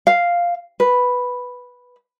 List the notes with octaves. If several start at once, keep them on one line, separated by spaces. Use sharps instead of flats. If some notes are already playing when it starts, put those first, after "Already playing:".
F5
B4